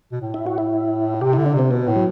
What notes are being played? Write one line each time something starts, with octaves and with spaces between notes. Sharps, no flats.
B2
A2
E4
F#4
E4
C3 G4
D3 E4
D4
C3 C4
B2 B3
A2
F#3